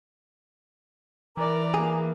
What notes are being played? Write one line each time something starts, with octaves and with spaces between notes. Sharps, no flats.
E3 A#4 D5 A#5 D6
A#3 G#4